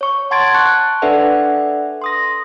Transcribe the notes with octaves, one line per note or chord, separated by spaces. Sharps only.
C#5 C#6
F#5 A5 C6 G#6 A6 D7
A5 C#6 F#6 C#7
D4 A4 B4 D5 E5 F#5
C6 D#6 A#6